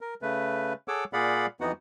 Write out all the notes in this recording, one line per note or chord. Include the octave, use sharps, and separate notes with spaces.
A#4
C#3 A3 B4
G#4 A4 C#5 F#5 D6 E6
A#2 G#4 D5 F5 F#5 B5
F2 E3 B3 D#4 F#4 F#5